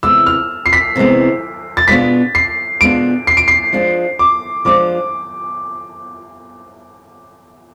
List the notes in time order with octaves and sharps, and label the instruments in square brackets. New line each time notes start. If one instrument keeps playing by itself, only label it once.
[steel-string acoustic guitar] C3 E3 G#3 B3 [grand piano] E6
[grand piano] F6
C7
B6
[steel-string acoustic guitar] C3 E3 G#3 B3
[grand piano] A6
[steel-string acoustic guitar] B2 G#3 B3 D4 F4 [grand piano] B6
[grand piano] C7
[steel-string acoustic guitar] B2 G#3 B3 D4 F4 [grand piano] D7
[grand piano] C7
D7
C7
[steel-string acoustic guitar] F3 G#3 D4 F4
[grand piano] D6
[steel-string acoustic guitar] F3 G#3 D4 F4 [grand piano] D6